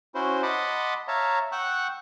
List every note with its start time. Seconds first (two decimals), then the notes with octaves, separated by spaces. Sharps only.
0.15 C#4 E4 F#4 C5
0.43 D#5 F#5 A5 B5 C6 D6
1.08 C#5 E5 F5 A5 A#5
1.52 F#5 G5 C#6 E6 F#6